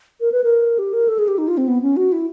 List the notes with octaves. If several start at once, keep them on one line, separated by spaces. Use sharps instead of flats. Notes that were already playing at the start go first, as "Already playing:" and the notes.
A#4
B4
A#4
G4
A#4
A4
G#4
G4
D#4
F4
C4
B3
C#4
F#4
E4